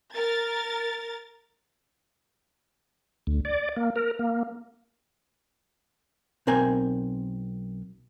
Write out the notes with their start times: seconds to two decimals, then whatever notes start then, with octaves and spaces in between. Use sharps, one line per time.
0.14 A#4 A6
3.27 D2
3.45 D5
3.76 A#3
3.96 A#4
4.19 A#3
6.47 B1 C4 A#4 G#5